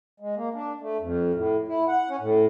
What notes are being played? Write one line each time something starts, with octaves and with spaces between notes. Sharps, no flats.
G#3
A#3
D4
A3
F2
A2
E4
F#5
C#4
A2